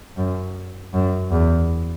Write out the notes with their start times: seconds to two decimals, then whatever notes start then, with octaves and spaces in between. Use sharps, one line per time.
0.17 F#2
0.94 F#2
1.32 E2